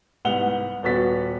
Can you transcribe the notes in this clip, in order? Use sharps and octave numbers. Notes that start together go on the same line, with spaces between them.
C2 G#2 B3 F#5 F7 G7
D#1 B3 F#4 A6 B6